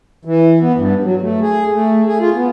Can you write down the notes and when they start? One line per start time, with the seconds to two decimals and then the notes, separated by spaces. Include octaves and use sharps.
0.25 E3
0.61 B3
0.75 G2
1.04 F#3
1.21 A3
1.41 G#4
1.73 A3
2.06 G#4
2.20 F4
2.34 B3